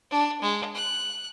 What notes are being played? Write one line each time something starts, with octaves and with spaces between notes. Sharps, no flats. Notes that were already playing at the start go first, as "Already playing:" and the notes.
D4
G#3
F#6